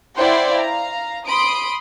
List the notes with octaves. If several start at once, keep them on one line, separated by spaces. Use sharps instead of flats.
E4 C5 D5 F#5 G5 C6
F5 A#5
B5 C6 D#6 D7